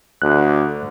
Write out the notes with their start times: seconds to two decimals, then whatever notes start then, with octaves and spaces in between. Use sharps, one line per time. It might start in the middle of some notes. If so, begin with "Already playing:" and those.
0.22 D2 F#6